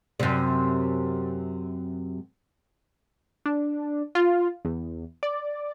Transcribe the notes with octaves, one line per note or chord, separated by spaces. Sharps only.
F#2 C3
D4
F4
E2
D5